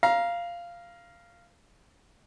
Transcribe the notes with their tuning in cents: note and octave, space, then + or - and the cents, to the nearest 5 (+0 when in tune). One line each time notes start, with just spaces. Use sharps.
F5 -10 A#5 +20